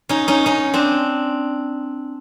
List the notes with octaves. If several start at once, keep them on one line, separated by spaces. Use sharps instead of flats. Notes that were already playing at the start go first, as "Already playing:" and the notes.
C#4 D#4
C#4 D#4
C#4 D#4
C4 D4